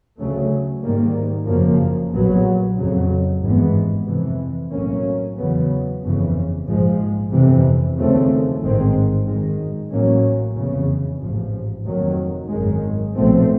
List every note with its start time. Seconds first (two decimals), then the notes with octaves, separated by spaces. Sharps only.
0.17 D2 C#3 F#3 A3
0.82 G#2 D#3 G3 A#3
1.47 F#1 F#2 C#3 F3 A#3
2.12 A#1 A#2 F#3 B3
2.77 F2 C#3 F#3
3.41 G#1 G2 E3 G#3 B3
4.07 F2 C3 E3
4.72 B1 A2 F#3 A#3 C#4
5.36 E2 C#3 F#3 B3
6.01 G1 F2 C#3 E3
6.66 A#1 G#2 F3 G#3
7.31 G1 F2 C3 E3
7.96 D#2 C#3 F3 A3 C4
8.61 A1 G#2 D#3 G#3 C4
9.26 F#2 D#3 G#3
9.90 A1 A2 F#3 A#3 C#4
10.55 F1 E2 C#3
11.20 A1 G#2 F3
11.85 F1 D#2 D#3 F#3
12.50 G#1 F#2 D#3 G#3
13.15 B1 A#2 F3 A3 C4